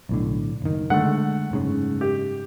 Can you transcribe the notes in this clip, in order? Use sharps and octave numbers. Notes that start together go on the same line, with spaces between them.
B1 A2 D3
F#1 D#3
D3 G#3 A3 F#5
F#1 G#2 C#3
G4